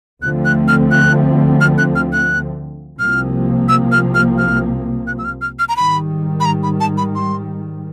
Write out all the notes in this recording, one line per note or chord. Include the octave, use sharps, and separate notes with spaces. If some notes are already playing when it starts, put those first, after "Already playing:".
D2 D3 F3 A3 C4 F#6
F#6
F6
F#6
F6
F#6
F6
F#6
C2 C3 F3 A#3 F6
E6
F6
F6
F6
F#6
E6
F6
F6
F6
A#5
G#2 D#3 G3 B5
B5
A#5
B5
A5
B5
C6